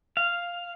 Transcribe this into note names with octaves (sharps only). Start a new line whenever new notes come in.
F5